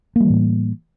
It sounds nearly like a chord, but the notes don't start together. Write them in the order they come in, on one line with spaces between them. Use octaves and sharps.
A#3 G3 E3 A2